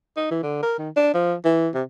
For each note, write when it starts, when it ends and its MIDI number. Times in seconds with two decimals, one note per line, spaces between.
0.16 0.28 63
0.31 0.39 52
0.43 0.60 50
0.63 0.74 70
0.79 0.89 51
0.96 1.12 62
1.14 1.34 53
1.44 1.68 52
1.74 1.83 48